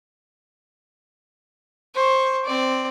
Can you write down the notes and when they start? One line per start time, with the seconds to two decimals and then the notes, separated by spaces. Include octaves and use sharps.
1.95 C5 C#6
2.45 C4 D5